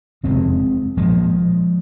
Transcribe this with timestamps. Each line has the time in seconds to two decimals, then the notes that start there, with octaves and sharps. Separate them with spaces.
0.24 F1 D#2 C#3 G#3 C4
0.97 A#1 A#2 F3 G#3